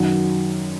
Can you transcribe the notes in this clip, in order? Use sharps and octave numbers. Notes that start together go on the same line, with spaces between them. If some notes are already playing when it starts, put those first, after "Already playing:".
Already playing: F#2 D#3 F#3